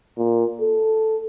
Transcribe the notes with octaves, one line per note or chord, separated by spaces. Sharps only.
A#2
A4